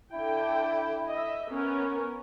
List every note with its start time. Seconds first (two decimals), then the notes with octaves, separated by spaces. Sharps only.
0.13 D3 E4 G5
1.09 D#5 E5
1.50 B3 C#4 A#4